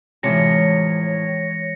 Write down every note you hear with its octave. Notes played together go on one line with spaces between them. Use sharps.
A2 C3 E3 F3 G#3 C#5 A#6 C#7